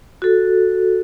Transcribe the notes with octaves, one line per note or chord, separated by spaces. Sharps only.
F#4 A4